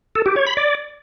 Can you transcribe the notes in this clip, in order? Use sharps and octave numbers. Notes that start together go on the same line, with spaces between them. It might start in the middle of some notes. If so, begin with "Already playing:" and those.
A4
G4
C#5
B5
D5